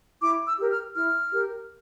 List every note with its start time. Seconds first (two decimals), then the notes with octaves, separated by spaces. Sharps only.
0.22 E4 D6
0.46 E6
0.58 G4 A#4
0.71 F6
0.95 E4 F6
1.32 G4 A#4